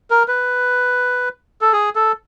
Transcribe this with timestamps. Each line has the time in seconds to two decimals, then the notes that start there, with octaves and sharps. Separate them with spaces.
0.11 A#4
0.28 B4
1.61 A4
1.73 G#4
1.95 A4